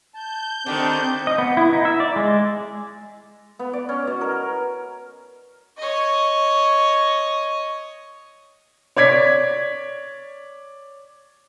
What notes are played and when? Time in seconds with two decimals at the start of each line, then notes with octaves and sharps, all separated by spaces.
0.14 A5 G6
0.66 D3 D#3 C4 D4 G4
1.27 D#5
1.38 B3
1.57 E4
1.73 D#4
1.85 E5
2.00 D5
2.16 G#3
3.59 B3
3.73 D5
3.89 C#4
4.07 B2
4.21 A#4
5.78 C#5 D#5
8.97 C#5 D5 G#6 B6